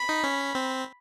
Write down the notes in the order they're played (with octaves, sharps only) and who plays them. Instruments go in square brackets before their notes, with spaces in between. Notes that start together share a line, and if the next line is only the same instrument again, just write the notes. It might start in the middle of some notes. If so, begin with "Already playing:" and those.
Already playing: [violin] B5
[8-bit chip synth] D#4
C#4
C4